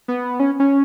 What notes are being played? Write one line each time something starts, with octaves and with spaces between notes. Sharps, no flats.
B3
C#4
C#4